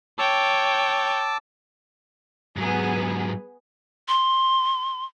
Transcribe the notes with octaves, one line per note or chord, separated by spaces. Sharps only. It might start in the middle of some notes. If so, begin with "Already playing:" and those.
C#5 G5 A5 D6 E6
G#2 F#3 B3 G#4
C6